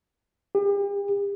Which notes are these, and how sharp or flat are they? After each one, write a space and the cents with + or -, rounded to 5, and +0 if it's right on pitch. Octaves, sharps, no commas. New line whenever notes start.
G4 +40